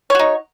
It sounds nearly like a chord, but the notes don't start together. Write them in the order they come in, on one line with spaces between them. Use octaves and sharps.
C#5 F#4 D#4